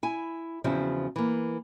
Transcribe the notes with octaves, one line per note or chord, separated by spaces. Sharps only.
E4 G#5
E2 C#3 F3 C4 E4 F#4
E3 A#3